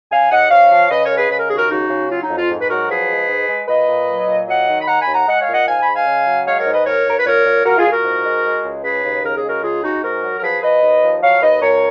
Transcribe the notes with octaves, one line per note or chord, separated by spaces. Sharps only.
C#3 F5 G#5
D#2 D#5 F#5
G#2 C#5 F5
F3
C#3 B4 D#5
A#4 C#5
G#3
G#4 B4
C#3 B4
A#4
D#2 G#4
F#4 A#4
C#3 D#4 F#4
C#3
F#3 F4
D#4
F2
F4
G#2
B4
F#3 F#4 A#4
F3 G#4 B4
G#3
G#2
G#3
A#2 B4 D#5
A#2
F#3
A#2
F#3 D#5 F#5
D#3
B5
D#2 F#5 A#5
G#5 B5
D#2
F#5 A#5
G#3 D#5 F#5
C#5 F5
A#2
D#5 F#5
G#2 F5 G#5
G#5 B5
G#3
F5 G#5
C#3
F#3
G#3 C#5 F5
A#4 C#5
G#2
B4 D#5
D#2 A#4 C#5
D#2 A#4
B4
A#2 A#4 C#5
A#2
A#2 F#4 A#4
F4 G#4
A#2
F#4 A#4
G#2
G#3
G#3
C#2
C#3 G#4 B4
D#2
C#3 A#4
G#4
G#3 F#4 A#4
C#2 F4 G#4
G#3 D#4 F#4
G#2 F#4 A#4
F#3
A#4
F3 G#4 B4
F3 B4 D#5
D#2
F3
F#3 C#5 F5
D#2 B4 D#5
C#2 A#4 C#5